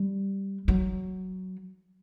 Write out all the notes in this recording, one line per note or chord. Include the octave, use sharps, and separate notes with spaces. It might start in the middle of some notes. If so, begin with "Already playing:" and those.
Already playing: G3
F#3